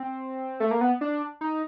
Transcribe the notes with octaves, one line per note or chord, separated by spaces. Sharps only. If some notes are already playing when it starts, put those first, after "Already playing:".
Already playing: C4
A3
A#3
B3
D4
D#4